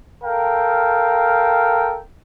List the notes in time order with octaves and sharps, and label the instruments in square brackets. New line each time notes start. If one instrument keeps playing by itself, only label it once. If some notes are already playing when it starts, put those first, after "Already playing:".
[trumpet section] A4 A#4 F5 G5